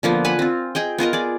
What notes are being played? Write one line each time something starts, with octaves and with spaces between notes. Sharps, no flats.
D3 F3 A#3 B3
B4 F#5 G#5
C4 F4
G#4 D#5 G5
B3 F4 A#4 D#5
G#4 D5